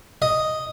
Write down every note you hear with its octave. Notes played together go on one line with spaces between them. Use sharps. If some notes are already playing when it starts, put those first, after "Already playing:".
D#5